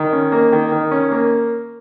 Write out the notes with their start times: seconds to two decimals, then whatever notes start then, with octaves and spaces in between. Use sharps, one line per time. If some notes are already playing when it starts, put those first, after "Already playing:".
Already playing: D#3
0.13 C#4
0.32 A#3
0.52 D#3
0.72 D#3
0.91 C#4
1.12 A#3